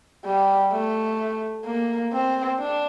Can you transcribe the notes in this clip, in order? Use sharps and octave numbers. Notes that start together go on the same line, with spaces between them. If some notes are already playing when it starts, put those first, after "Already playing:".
G3
A3
A#3
C4
D4